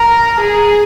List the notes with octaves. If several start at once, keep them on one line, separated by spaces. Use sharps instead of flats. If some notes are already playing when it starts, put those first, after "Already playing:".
Already playing: A#4
G#4